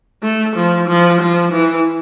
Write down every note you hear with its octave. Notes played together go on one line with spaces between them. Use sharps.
A3
F3
F3
F3
E3